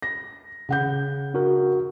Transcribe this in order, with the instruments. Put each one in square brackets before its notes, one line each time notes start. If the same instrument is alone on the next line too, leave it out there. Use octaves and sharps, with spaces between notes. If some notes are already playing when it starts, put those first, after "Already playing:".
[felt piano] A#6
C#3 F#5 G6
[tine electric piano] D4 F#4 A#4